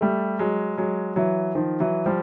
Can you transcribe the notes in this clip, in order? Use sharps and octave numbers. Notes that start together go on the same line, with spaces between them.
G3 A3
F#3 G#3
F#3 G#3
E3 F#3
D#3 F3
E3 F#3
F3 G3